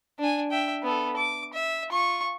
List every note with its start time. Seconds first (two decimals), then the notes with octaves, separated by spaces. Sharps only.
0.19 D4 G#5
0.51 E5 G5
0.83 B3 A4
1.16 D6
1.53 E5
1.90 F4 C#6